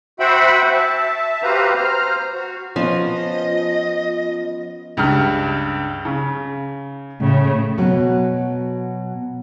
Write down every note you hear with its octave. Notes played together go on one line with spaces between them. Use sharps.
F#4 C5 E5 F#5 G5 B5
E5 A5
F#4 G4 B4 C5 F5 A#5
C5 A#5 F6
F#4
F3 B3 C#4 F4 D#5
C#2 G2 F6
C#3
A2 C#3
B2 F#3